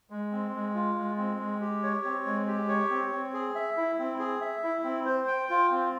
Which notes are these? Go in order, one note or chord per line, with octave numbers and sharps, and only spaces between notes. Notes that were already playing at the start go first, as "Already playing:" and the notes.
G#3
C4
G#3
F4
G#3
C4
G#3
G4
C#5
C4
G#3
G4
C#5
C4
C4
G#4
E5
E4
C4
G#4
E5
E4
C4
C5
G5
F4
C4